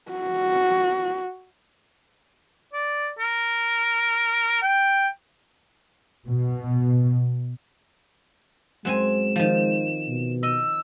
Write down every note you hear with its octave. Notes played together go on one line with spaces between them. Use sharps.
F#4
D5
A#4
G5
B2
F#2 G#3 C4 G#5 E7
D#3 F3
B2
D#5 E6